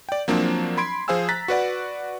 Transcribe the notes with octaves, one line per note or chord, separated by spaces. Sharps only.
D5 G5
F3 F#3 A#3 C4 D4
B5 C6 G#6 D7
F3 G#4 C5 F5 G#5 E6
A#5 F#6 A6 B6
F#4 B4 D5 F#5